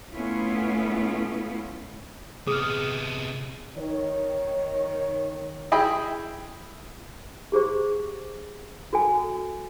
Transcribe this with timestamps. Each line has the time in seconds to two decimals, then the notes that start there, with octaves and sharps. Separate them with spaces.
0.12 A3 B3 C#4 E4 F4
2.47 C3 B3 G#4 D#6 F6
3.77 D#3 C#5
5.72 E4 G#4 D#5 G5 B5
7.52 G4 G#4 C5 C#6
8.93 F#4 A4 G#5